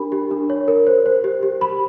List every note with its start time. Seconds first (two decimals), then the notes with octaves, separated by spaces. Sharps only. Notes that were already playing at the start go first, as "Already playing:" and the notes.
Already playing: D4 G4 A#4 B5
0.12 G4
0.31 D4
0.50 C#5
0.68 A#4
0.87 C5
1.06 C5
1.24 G4
1.43 G4
1.61 G4 B5